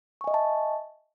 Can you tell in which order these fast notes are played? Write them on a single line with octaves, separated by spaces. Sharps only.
C#6 G#5 D#5 E5 A5